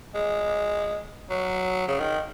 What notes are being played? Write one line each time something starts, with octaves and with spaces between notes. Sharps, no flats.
G#3
F#3
C#3
D#3